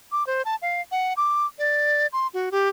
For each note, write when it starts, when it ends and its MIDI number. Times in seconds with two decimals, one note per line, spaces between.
0.12 0.26 86
0.27 0.42 72
0.45 0.56 81
0.62 0.81 77
0.92 1.13 78
1.17 1.46 86
1.59 2.07 74
2.13 2.27 84
2.34 2.49 66
2.52 2.69 67